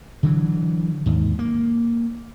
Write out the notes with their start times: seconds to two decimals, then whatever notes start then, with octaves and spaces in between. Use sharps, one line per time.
0.23 D3 E3 F#3
1.06 D#2 G#2
1.39 A#3